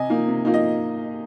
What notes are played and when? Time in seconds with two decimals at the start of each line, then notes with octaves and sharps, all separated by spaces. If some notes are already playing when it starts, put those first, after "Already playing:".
Already playing: C3 D#5 G#5
0.10 F3 A#3 D#4
0.28 C3
0.45 F3 A#3 D#4
0.54 D#5